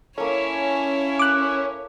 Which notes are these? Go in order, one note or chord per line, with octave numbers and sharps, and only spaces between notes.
A#3 C#4 E4 A4 C#5
D6 F#6